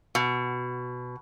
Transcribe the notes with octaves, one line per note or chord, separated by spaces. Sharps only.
B2